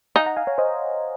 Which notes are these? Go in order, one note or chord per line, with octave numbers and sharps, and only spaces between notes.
D#4 F5 G#5
F#5 A#5
F5 G#5
C#5 F5
C5 D#5